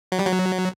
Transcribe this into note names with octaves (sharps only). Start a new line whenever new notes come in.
F#3
G3
F#3